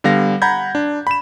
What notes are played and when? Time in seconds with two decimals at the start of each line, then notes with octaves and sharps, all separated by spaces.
0.04 D3 G3 B3 F5 A#6
0.42 F#5 A#5 B5 G6 G#6
0.75 D4
1.07 B5 E7